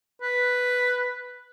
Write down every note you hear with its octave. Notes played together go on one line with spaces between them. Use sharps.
B4